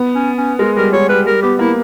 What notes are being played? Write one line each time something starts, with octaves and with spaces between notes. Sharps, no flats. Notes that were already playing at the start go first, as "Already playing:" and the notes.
Already playing: B3
C#4
C#4
G#3 A#4
G3 A#4
G#3 C#5
G3 B4
G3 A#4
B3 G4
A#3 E4